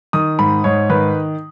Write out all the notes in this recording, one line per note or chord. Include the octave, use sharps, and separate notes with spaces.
D#3 D#6
G#2 B5
G#2 C#5
D#3 B4